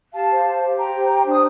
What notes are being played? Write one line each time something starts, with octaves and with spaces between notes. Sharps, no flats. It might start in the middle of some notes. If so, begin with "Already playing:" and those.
G4 F5 A5
C5
C5
G4
C5 G5 A#5
G4
C5
D4 D#6